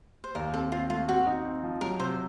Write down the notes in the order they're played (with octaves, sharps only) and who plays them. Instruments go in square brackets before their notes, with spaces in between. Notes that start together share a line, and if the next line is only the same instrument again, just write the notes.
[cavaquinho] C5
[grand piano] D#2 [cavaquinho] A#4
[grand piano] C4 [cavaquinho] A4
[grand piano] C4 [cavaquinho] F4
[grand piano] A3 [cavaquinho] F4
[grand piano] C4 [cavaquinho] F#4
[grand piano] D#4
C4
F3
[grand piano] F#3 [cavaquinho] A#4
[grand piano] C3 [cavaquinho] C5